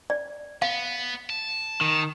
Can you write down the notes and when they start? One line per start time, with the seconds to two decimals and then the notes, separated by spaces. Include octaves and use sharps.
0.10 D5
0.62 B3 F5
1.30 A5
1.81 D#3